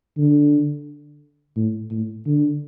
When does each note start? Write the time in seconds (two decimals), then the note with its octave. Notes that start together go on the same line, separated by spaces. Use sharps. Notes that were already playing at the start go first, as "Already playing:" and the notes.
0.17 D3
1.56 A2
1.91 A2
2.26 D3